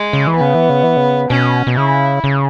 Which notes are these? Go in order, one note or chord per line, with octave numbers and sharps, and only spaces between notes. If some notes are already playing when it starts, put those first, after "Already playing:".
Already playing: G#3
C#3
E3
B3
C#3
E3
C#3
E3
C#3
B2 C#4
B2
C#3 E4
C#3